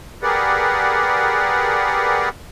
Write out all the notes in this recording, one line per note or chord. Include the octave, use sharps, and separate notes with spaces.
G4 G#4 A#4 B4 D5 F#5